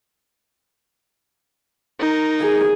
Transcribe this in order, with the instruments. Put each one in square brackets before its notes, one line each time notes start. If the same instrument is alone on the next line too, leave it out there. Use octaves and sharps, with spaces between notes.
[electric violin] D#4 A#4
[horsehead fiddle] G#4